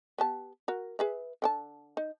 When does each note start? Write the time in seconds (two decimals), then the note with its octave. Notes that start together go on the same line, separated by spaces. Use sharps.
0.18 B3 G4 A5
0.68 F#4 A#4
0.99 G#4 B4 E5
1.42 D3 G5 A5
1.97 D#4